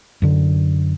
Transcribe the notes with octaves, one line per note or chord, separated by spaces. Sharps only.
F#2 D3